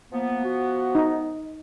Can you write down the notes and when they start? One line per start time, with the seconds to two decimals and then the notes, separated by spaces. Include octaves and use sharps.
0.13 F3 A#3 B3
0.44 F#4
0.95 D#4